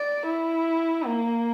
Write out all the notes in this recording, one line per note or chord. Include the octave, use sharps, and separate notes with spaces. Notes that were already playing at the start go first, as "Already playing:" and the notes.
Already playing: D5
E4
A#3